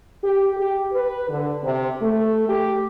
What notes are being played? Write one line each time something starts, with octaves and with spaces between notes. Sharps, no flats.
G4
G4
B4
D3
C3
A3
G4